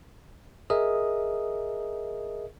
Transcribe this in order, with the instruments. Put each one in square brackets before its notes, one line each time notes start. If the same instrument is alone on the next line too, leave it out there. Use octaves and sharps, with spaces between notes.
[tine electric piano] G#4 A#4 D#5 E5 D#6